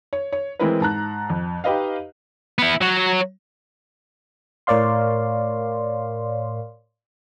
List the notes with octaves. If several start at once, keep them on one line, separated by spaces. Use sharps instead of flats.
C#5
C#5
E3 G#3 C4 E4 A#4 B4
G#2 A5 A#5 F#6
F2
D#4 G4 B4 D#5 F5
B3 E4
F#3 F#4
A2 A#4 C#5 D5 F5 C6